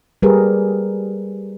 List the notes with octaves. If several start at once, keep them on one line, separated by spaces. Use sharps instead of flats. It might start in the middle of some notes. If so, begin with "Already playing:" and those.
G3 G4 G#4 A#4 B4